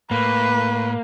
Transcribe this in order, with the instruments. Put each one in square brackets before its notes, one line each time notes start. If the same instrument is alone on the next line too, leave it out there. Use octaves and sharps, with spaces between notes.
[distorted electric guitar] A2 [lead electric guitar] A#3 [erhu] B4